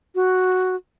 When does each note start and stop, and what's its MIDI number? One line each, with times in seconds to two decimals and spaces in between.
0.15 0.76 66